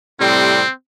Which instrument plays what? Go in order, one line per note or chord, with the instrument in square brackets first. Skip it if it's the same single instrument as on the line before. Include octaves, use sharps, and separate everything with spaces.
[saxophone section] A2 C3 G3 [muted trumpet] C4